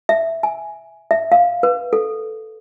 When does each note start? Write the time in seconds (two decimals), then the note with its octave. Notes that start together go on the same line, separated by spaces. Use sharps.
0.09 E5
0.43 G#5
1.11 E5
1.32 F5
1.63 B4
1.93 A4